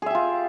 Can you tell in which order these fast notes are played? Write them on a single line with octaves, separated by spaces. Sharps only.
G#4 E5 G4 F4